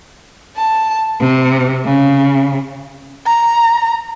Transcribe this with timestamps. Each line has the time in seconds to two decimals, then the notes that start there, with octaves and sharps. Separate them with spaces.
0.56 A5
1.18 C3
1.84 C#3
3.26 A#5